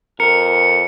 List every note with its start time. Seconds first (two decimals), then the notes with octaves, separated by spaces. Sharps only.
0.20 F2 A#4 C#7